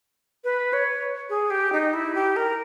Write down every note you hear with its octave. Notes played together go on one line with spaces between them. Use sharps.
B4
C#5
G#4
G4
D#4
E4
G4
A#4